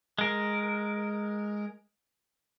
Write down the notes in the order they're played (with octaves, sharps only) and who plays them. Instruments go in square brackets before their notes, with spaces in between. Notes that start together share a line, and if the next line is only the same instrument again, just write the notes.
[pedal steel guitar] G#3 A#4